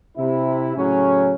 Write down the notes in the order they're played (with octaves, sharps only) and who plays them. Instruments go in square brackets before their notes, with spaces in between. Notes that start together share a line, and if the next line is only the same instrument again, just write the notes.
[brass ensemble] C3 E4
A2 C#3 F#3 C#4